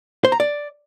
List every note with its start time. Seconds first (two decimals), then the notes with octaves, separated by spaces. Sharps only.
0.25 C5
0.32 A#5
0.40 D5